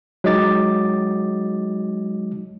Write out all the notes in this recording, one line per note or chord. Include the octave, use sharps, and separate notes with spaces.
F#3 G#3 D#4 D#5 D6 A6